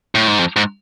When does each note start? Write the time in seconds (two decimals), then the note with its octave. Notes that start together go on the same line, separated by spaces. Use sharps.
0.15 A2
0.27 G#2
0.39 F2
0.56 G#2